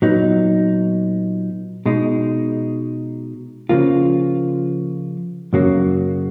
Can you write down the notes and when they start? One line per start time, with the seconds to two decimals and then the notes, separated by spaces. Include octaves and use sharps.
0.02 A#2 F#3 B3 D#4
1.86 B2 G#3 D#4
3.69 C#3 F3 A#3 F4
5.53 F#2 C#3 F#3 A#3